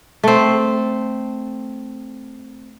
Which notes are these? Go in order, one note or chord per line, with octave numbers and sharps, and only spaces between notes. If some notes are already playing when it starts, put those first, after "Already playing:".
A3 C4